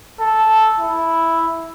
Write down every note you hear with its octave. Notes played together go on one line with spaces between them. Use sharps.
A4
E4